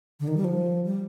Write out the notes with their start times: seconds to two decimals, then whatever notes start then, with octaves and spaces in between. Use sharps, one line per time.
0.20 D3
0.28 D#3
0.37 G3
0.44 F3
0.85 G3